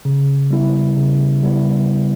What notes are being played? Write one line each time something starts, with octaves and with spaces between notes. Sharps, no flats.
C#3
G3 B3 E4
C#3
G3 B3 E4